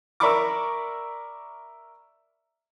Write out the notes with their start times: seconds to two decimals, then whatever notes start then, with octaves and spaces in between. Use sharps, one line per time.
0.20 A#4 D5 E5 B5 C#6 D6